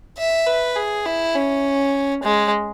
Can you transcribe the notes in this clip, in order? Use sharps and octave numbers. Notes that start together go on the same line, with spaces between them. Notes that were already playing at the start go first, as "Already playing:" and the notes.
E5
B4
G#4
E4
C#4
G#3